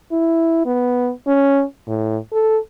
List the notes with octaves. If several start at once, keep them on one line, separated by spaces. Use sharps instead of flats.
E4
B3
C#4
A2
A4